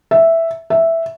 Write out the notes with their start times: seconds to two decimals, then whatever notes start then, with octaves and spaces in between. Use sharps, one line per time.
0.11 E5
0.70 E5